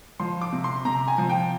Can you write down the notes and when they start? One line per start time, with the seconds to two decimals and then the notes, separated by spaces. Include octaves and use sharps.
0.20 F3 C6
0.42 D6
0.53 C3
0.64 C6
0.85 C3 A#5
1.08 G#5
1.18 F3
1.29 G5